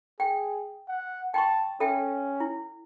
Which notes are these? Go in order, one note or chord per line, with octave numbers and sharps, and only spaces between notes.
G#4 G5
F#5
G5 A5 C6 C#6
C#4 A4 E5 G5
E4